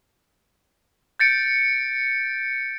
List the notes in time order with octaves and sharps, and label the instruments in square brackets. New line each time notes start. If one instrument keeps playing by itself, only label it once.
[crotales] G6 A6 C#7 D7